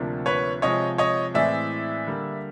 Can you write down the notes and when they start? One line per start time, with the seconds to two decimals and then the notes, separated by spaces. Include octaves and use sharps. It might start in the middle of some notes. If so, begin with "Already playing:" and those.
Already playing: D2 C3 F3 A#3 D4
0.26 B4 C#5
0.62 C3 F3 G#3 C#5 D#5
0.98 C#5 D#5
1.34 A2 E3 G#3 C4 D5 E5
2.07 D3 G3 A#3